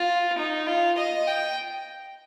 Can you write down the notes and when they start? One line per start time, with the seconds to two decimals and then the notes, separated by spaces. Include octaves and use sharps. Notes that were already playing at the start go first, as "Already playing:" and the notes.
Already playing: F4
0.37 D#4
0.66 F4
0.98 D#5
1.27 G5